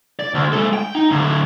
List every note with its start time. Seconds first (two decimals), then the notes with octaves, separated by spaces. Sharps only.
0.20 D5
0.34 D2
0.52 G#3 A4
0.73 G5
0.95 D#4
1.11 A2 D3